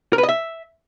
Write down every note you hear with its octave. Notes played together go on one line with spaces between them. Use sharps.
A#4
B4
D#5
E5